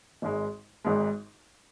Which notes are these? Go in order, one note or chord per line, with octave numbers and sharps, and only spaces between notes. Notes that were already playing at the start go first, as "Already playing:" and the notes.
G#1 G#2 G#3
G#1 G#2 G#3